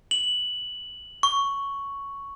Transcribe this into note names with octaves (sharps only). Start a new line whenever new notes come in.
F#7
C#6